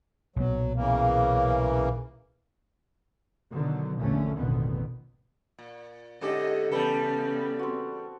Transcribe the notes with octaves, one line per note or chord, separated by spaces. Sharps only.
B1 A#2 F#3 B3
C#3 E3 A#3
B2 D3 D#3 F#3
A#1 E2 D3 A3 C#4
A1 F2 B2 D3 D#3 B3
A#2
G#2 D3 C#4 G4 A4 D#5 E5
E2 C#3 G3 B3 A4 B4 G5 A5
C4 F#4